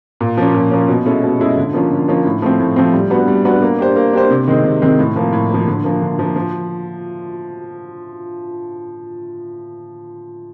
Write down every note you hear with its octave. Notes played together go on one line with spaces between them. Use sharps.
A#2
F3 A#3 C#4
A#2
F3 A#3 C#4
B2
G#3 C#4 E4 A4
B2
G#3 C#4 E4 A4
D3
F3 A#3 C#4 F4
D3
F3 A#3 C#4 F4
A2
F3 A3 C4
A2
F3 A3 C4
G3
B3 D4 F#4 B4
G3
B3 D4 F#4 B4
A#3
D4 G4 C5
A#3
D4 G4 C5
C3
D#3 G#3 C4
C3
D#3 G#3 C4
A2
F3 A#3
A2
F3 A#3
D3
F3 A#3
D3
F3 A#3
F3